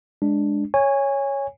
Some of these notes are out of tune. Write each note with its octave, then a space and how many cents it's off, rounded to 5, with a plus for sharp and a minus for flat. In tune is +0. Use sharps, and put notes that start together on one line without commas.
G#3 +0 D4 +0
C#5 +0 G#5 -20